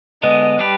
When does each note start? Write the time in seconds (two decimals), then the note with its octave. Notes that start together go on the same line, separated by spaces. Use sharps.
0.23 D3 G#3 B3 D#5
0.59 G3 D4 G4 B4